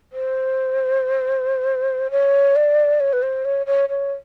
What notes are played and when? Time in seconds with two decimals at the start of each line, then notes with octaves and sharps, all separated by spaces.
0.12 C5
2.11 C#5
2.56 D5
3.00 C#5
3.13 B4
3.22 C5
3.45 C#5
3.67 C#5
3.89 C#5